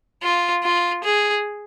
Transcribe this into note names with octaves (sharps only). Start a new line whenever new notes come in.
F4
F4
G#4